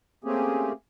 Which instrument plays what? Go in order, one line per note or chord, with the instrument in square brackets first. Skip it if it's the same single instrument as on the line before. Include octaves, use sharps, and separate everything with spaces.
[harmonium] A3 A#3 C4 C#4 G4 G#4